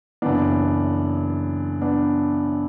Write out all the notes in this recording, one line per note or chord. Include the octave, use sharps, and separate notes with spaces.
F#1 F#2 E3 B3 D4
B3 D4